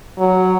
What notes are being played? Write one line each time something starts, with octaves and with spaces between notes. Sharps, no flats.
F#3